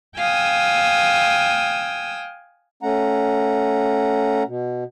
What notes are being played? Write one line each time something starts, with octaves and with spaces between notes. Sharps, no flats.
F5 G5 G#5 D#6 E6
A3 C#4 F#5 A#5
B2